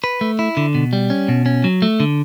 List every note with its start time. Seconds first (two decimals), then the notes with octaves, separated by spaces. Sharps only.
0.04 B4
0.21 A3
0.39 E4
0.57 D3
0.75 B2
0.93 G3
1.10 C#4
1.29 B2
1.46 C#4
1.64 F#3
1.82 A3
2.00 D3